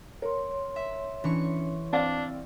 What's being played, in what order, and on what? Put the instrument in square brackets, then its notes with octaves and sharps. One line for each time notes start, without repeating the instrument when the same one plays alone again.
[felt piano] A#4 [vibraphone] C#5 C6
[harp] E5
[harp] E3 C#6 C#7 [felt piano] C#4 D4
[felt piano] C4 D5 F5 [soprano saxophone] D4